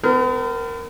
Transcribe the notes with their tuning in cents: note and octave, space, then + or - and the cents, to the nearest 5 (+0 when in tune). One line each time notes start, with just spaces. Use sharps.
B3 +45 A#4 -10